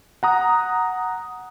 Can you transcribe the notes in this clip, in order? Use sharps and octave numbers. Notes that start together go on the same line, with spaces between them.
F#5 A#5 D#6